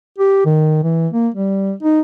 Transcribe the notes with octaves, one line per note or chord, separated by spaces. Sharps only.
G4
D#3
E3
A#3
G3
D#4